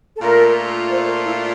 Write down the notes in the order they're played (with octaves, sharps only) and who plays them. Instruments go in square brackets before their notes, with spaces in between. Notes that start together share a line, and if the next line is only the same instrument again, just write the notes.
[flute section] A4
[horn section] A#2 A3 D4 F4 [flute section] A#4
[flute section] C5
A#4
E4